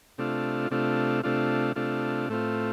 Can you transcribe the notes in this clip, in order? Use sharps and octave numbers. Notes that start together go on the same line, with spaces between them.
C3 A3 D4 F4
C3 A3 D4 F4
C3 A3 D4 F4
C3 A3 D4 F4
A2 A3 C4 F4